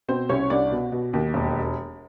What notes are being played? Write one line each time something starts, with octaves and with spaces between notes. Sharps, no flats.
B2 C4 C5
C2 C#4 C#5
C2 D4 D5
B2
B2
D#2
E1